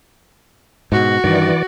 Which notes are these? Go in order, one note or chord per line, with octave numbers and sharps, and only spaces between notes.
G#2 B2 F#4
G2 D#3 E3 D5